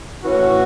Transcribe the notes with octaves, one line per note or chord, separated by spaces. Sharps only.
A2 E3 C#4 F#4